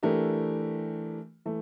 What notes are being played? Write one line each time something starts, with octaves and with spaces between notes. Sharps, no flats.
E3 A3 D4 G4 A#4
E3 A3